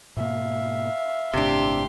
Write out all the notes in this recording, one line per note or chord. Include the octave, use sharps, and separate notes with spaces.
G#2 B2 A#3 E5 F5
G1 A2 C3 D4 G4 C6